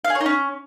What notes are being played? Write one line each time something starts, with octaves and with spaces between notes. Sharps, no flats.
F5
G#4
C#5
D#4
C#4